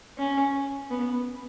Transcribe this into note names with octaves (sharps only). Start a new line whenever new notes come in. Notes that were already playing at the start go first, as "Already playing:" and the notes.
C#4
B3